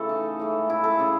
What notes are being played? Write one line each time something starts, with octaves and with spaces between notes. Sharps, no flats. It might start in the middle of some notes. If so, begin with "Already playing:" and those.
Already playing: C#3 E3 A3 A4
D#4
A2 E3 G#3
E4
A4
C#3 G#3 G#4